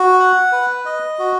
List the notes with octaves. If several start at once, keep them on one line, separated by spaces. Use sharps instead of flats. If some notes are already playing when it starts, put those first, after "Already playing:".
Already playing: F#4
F#5
B4
D#5
F#4